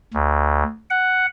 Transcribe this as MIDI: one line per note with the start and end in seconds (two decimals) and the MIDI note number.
0.14 0.64 38
0.90 1.26 78